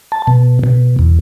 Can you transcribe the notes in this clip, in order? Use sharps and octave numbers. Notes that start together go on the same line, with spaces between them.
A5
B2
B2
E2